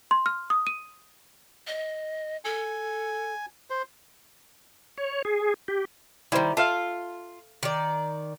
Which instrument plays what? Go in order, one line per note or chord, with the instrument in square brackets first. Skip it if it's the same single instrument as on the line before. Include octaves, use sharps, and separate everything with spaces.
[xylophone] C6
F6
D#6
D#7
[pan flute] D#5
[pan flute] A4 [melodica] G#5
[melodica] C5
[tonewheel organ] C#5
G#4
G4
[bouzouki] D#3 G3 [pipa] E4 G4 C5
[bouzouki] F4 [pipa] A4 E5 F5
[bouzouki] D#3 D5